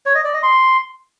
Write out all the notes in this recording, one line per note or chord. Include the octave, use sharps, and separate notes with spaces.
C#5
D#5
D5
D#5
C6